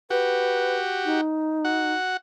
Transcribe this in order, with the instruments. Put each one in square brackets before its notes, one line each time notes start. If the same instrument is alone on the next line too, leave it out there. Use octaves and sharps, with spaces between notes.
[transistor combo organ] F#4 G4 [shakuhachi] B4
[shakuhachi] D#4
[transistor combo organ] F#4 F#5